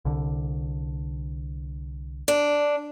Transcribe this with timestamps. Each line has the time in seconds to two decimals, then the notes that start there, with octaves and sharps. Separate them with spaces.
0.05 C2 D3
2.28 D4